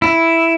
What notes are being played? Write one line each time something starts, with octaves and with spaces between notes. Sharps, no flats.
E4